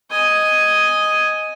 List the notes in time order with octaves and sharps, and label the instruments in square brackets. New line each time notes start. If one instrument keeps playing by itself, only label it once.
[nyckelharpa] D#5 G#5